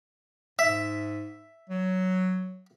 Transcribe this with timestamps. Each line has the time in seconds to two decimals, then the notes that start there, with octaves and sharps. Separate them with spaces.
0.59 G#2 E5
1.69 F#3